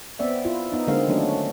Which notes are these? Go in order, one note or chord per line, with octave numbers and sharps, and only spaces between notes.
B3 C4 D5 E5
E4 F4
B3 D#4
D3 G#3 A#3 C4 F5
D#3 F#3 A3 C#4 D4